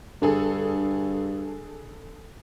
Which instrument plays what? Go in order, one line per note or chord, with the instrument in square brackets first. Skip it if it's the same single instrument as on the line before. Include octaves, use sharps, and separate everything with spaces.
[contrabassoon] G2 [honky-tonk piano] D3 G#4 A4